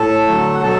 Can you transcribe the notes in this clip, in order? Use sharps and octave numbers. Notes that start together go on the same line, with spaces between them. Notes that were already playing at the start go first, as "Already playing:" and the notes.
Already playing: A2 A4 A5
D3 F#3 A3
F#5
B2 F#3 A4 A5